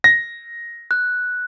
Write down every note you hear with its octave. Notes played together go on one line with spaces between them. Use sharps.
A#6
F#6